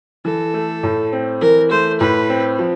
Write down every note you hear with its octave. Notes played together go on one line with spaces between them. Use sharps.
E3 A4
A3
A2
C4
E3 A#4
A3 C5
A2 B4
C4
F3